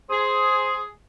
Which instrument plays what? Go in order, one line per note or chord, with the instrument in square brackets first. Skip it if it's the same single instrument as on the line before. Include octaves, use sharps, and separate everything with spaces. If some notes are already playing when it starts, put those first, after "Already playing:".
[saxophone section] G#4 [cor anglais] C5